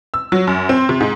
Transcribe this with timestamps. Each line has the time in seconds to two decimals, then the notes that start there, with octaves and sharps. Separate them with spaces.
0.14 E6
0.32 F#3
0.47 F#2
0.69 C4
0.89 C3
1.00 G#2